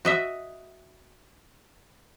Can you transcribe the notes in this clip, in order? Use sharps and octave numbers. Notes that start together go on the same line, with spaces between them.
F#4 D#5 E5